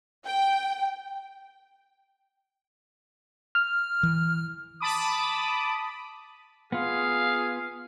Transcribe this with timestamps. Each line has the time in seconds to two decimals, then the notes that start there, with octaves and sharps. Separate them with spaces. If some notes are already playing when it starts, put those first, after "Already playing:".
0.25 G5
3.55 F6
4.03 E3
4.80 A5 B5 D6 D#6
6.72 B3 F4 G#4 F5